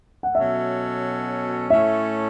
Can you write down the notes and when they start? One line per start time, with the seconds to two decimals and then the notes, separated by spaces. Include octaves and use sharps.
0.23 F#5
0.35 B2 F#3 C#4 A4 E5
1.69 A2 A3 C#4 A4 C#5 E5